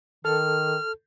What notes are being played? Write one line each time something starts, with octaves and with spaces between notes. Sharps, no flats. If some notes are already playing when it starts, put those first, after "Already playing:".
D#3 A4 F6